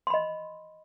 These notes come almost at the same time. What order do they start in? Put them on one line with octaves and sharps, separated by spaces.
C6 B5 D#5